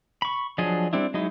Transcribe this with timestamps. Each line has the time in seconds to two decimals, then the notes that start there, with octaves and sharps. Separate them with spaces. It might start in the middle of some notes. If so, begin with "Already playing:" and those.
0.22 B5 C#6
0.58 F3 F#3 D4 G#4 D#5
0.93 G3 C4 D4 E4
1.14 F#3 G#3 D#4 E4